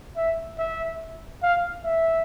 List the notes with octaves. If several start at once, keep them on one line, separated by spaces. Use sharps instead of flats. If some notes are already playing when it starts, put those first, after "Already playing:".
E5
E5
F5
E5